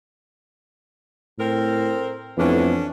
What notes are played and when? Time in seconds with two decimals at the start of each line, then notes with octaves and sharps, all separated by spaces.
1.38 A2 C4 A#4
2.38 F2 E3 A3 B3 C#4 D4